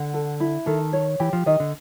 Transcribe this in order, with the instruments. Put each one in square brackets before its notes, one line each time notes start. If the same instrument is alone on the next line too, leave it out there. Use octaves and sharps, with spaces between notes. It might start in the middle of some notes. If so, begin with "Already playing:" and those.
Already playing: [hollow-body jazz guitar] D3 [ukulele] F#5
[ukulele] A4
E4
[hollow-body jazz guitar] D#3 [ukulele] A4
[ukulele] C#5
[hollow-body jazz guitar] E3 [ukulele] G4
[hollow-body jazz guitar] F3
[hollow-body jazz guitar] D#3 [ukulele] D#5
[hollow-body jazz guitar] D3